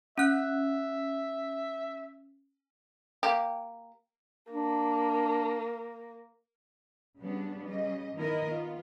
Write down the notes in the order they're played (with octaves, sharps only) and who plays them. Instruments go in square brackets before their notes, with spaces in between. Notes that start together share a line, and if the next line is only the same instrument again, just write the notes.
[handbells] C#4 F#6 [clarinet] E5
[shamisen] A#3 G4
[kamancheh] A#3 [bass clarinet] D4
[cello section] C#3 G3 B3 D4
C#3 G3 D#5
D#3 B3 E4 A#4 D#5
B3 F4